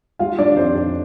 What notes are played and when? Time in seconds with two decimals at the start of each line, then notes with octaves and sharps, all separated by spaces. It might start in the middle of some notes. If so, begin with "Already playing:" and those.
0.19 G3 F4 F5
0.38 G3 D4 D5
0.57 F2 C4 C5
0.75 F2